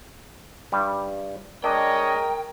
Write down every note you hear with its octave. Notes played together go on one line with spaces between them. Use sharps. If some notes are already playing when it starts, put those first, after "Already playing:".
G2 G3
G#3 D4 A#4 C#5 D#5 G5